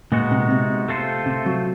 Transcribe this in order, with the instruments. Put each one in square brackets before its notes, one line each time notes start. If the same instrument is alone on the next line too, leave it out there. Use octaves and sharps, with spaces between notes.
[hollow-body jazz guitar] A#2 [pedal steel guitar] G#3 B3 D#4 F#4
[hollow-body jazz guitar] C3
C3
[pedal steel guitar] A3 C4 F4 A4 C5
[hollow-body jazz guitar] C3
F#3